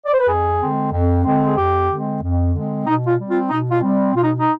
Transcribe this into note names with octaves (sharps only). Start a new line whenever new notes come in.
D5
C5
B4
F2 G#4
D3 G#3 C4
F2
D3 G#3 C4
G#4
F2 G4
D3 G#3 C4
F2
D3 G#3 C4
B2 D#4
F4
G3 C4
F4
B2 D#4
F4
G3 C4
B2 F4
D#4
D#4